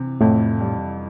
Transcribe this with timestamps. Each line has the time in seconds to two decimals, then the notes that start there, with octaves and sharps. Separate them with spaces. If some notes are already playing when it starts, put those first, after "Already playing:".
Already playing: C3 E3
0.21 F2 A2
0.60 G3